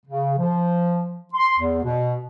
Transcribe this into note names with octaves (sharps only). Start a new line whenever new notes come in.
C#3
F3
C6
E2
B2